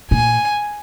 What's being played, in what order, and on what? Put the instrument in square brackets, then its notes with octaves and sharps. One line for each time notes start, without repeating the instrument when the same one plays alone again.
[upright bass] A#2 [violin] G#5